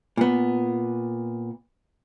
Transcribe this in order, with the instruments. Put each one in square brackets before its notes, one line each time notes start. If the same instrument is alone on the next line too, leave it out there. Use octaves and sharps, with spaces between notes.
[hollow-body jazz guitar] A#2 B3